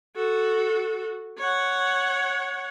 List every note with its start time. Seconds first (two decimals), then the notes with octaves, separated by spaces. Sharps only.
0.16 F#4 A4
1.38 C#5 F#5